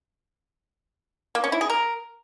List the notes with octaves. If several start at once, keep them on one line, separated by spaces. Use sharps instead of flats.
A#3
C#4
E4
G#4
A#4